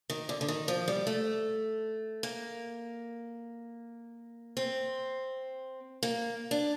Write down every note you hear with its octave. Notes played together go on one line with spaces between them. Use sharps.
D#3
D3
D3
D#3
F3
G3
A3
A#3
C4
A#3
D4